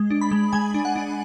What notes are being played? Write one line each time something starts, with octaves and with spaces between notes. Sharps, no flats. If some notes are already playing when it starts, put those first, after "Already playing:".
Already playing: G#3
D4
B5
G#3
G#3 G#5
D4
F#5
D4